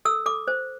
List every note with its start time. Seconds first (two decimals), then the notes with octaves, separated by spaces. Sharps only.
0.05 A4 E6
0.26 A4 D6
0.48 C5